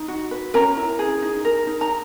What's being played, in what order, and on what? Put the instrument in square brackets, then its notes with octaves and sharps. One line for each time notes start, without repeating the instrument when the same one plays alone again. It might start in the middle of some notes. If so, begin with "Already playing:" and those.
Already playing: [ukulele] D#4
F#4
B4
C#4 A#4 A#5
E4
G#4
D#4
A#4
D#4
A#5